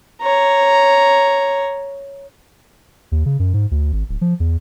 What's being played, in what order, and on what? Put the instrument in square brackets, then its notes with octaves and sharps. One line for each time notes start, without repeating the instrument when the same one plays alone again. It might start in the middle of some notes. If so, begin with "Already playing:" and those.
[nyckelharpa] C#5 A#5
[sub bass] D#2
C#3
F#2
G#2
D2
G#1
D1
F3
E2